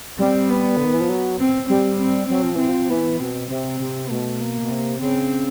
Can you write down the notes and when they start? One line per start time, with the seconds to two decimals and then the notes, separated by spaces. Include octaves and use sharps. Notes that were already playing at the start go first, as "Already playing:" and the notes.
0.19 G3 C4
0.49 B3
0.77 D3
0.85 D#3
0.93 E3
1.01 F3
1.09 F#3
1.40 C4
1.69 G3 C4
2.00 C4
2.29 F#3 C4
2.42 F3
2.55 E3 C4
2.69 F3
2.89 E3 B3
3.20 B2 C4
3.50 C3 C4
3.80 C3
4.10 B2 A3
4.41 A#3
4.62 B2
4.71 C3
5.00 C#3 C4